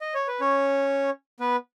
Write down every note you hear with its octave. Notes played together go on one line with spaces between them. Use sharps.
D#5
C#5
B4
C#4 C#5
B3 B4